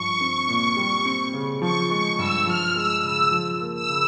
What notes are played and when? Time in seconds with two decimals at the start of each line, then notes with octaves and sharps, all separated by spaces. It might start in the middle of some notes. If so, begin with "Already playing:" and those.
Already playing: G2 F3 C#6
0.21 C4
0.49 A#2
0.77 G3
1.05 C4
1.34 C#3
1.61 F3 C#6
1.90 G#3 C#6
2.18 G2 E6
2.47 F3 F6
2.75 G#3 E6
3.04 C#3 E6
3.31 F3
3.60 A#3
3.75 E6
3.89 C#3